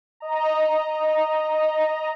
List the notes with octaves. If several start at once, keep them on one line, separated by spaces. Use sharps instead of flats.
D#5 A#5